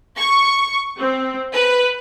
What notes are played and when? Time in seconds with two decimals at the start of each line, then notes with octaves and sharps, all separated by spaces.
0.18 C#6
0.99 C4
1.53 B4